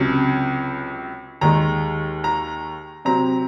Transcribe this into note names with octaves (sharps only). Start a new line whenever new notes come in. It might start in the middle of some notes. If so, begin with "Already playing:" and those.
Already playing: C#2 C3 F#3 C#4
D#2 D#3 G#3 A#5
A#5
C3 F#3 C4 A#5